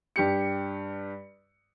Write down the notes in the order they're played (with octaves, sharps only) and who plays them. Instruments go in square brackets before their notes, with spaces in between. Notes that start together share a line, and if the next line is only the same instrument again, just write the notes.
[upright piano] G2 G4 C#7